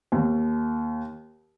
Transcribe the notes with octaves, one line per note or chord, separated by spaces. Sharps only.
D#2